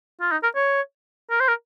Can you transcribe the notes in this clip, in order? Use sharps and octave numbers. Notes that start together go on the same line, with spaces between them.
F4
D#4
A#4
C#5
A#4
C5
A#4